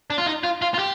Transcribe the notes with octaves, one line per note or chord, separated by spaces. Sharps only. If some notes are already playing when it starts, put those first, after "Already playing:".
D4
F4
D#4
F4
F4
F4
G4